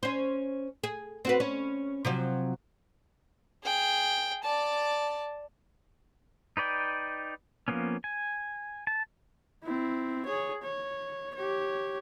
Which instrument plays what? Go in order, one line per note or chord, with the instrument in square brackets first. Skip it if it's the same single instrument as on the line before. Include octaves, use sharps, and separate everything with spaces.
[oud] C#4 C5
G#4
C4 F#4 B4
C#4
C3 F3 F#3
[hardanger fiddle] G#4 G5
D5 A5
[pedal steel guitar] D#4 B4 D5 G5
F3 A#3 B3 C#4
G#5
A5
[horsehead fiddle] C4 E4
G#4 C#5
C#5
G4 C#5